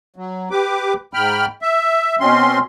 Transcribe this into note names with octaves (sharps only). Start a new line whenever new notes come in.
F#3
G4 B4 D6
G#2 G5 B5 F6
E5
B2 C4 C#4 C6